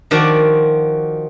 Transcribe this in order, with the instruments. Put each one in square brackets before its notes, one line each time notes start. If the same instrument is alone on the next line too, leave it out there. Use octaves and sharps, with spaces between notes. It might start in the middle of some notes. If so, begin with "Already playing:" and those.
[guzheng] D#3 F3 F#4 D5